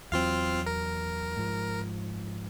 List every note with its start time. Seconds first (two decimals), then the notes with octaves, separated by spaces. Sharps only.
0.12 E2 F#3 C4 F4 F5
0.66 A#4
1.37 G#2 F3